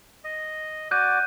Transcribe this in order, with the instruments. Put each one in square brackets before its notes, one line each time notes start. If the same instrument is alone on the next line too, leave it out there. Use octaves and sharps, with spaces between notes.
[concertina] D#5
[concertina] F#4 D5 [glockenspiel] F#6 G6 D#7